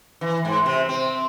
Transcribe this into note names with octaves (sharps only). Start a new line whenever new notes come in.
E3
G#2
C3
C4